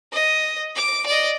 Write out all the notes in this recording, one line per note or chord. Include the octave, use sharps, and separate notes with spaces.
D#5
D6
D5 D#5